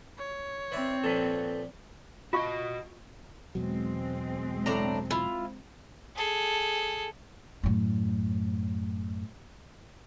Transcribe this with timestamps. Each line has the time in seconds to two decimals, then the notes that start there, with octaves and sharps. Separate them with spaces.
0.18 C#5
0.72 C4 B4 D5 E5
1.04 A#2 F3 A4 B4
2.33 F4 F#4 D#5 F5 C#6
3.55 E2 B2 F#3 G#3 C4
4.66 A2 D4 A#5
5.11 E4 F4
6.16 G#4 A4
7.63 F#2 A2